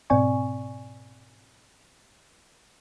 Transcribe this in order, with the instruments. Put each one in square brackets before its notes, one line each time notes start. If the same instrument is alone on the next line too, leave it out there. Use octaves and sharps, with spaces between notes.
[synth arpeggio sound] G#2 B2 C4 D5 G#5 C#6